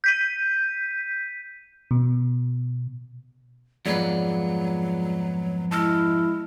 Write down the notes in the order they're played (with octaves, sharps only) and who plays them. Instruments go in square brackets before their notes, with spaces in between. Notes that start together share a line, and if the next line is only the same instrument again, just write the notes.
[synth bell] G6 B6 D#7
[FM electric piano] B2
[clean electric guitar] F2 G#2 B3 [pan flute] F#3 [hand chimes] F4 G#4 D5
[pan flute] G#3 [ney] E4 [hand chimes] A5 E6 F6